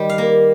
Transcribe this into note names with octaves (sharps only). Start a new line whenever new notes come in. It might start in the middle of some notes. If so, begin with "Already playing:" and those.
Already playing: D#3 G3 G5
F5
A#3